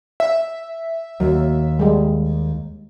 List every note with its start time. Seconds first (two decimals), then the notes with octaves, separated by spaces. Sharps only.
0.20 E5
1.20 D#2 F#3
1.79 G3 G#3